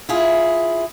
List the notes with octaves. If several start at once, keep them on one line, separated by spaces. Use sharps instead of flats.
E4 F4 G#4